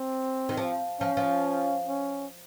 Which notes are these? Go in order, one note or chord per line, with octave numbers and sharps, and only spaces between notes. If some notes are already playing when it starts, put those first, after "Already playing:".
Already playing: C4
D#3
F3
F3 C#4
F3
C#4